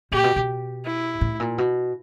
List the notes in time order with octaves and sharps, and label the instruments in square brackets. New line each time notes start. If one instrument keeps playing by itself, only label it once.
[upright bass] A#2 [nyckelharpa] G4
[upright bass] B2
B2
[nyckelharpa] E4
[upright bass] A2
A#2
B2